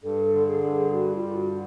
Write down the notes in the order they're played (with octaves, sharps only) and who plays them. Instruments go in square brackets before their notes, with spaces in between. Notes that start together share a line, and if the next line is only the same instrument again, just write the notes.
[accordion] G2 [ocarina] A4
[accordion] D3
[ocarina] G#4
[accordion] G2
[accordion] G3 [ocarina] F#4
[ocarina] F4
[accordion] G2
[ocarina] F#4
[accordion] D3